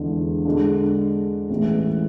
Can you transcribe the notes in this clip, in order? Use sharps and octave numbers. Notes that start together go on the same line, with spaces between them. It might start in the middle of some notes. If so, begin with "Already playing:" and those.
Already playing: E2 D3 G#3
D3 G#3 D4
A1 A2 E3 G#3